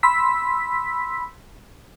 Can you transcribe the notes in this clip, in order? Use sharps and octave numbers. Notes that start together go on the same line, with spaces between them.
B5 C6 E6 B6